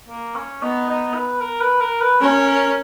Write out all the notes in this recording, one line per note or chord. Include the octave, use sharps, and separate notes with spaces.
A#3
C#4
B3 D#4
D#4
B4
A#4
B4
A#4
B4
C#4 A#4
A#4